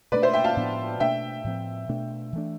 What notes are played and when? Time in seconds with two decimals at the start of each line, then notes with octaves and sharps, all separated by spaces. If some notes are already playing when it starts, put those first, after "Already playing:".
0.12 B2 A3 D4 B4 D5
0.22 C5 E5
0.33 E5 G5
0.44 F5 A5
0.57 A2 F3 B3 D4
1.00 B2 A3 D4 E5 G5
1.44 A2 F3 C4
1.89 B2 A3 D4
2.33 E3 A3 D4